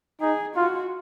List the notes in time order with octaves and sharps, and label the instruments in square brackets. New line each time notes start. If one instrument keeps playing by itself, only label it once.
[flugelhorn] D#4 [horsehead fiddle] G#4
[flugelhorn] F4 [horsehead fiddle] F#4